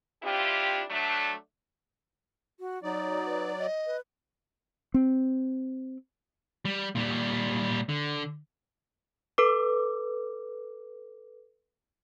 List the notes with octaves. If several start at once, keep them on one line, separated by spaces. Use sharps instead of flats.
C4 D4 E4 F4 G4
F#3 A3 D4
F#4
F#3 D#4 D5
B4
D#5
B4
C4
G3
A#2 G3
D3
A4 B4 D6